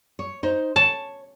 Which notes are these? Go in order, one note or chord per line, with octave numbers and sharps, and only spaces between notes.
C#5
D#4 C5
C#5 A5